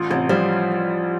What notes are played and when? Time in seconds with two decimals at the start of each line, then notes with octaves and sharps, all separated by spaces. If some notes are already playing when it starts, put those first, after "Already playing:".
Already playing: A1 F4
0.11 A1 C3
0.29 F3 G3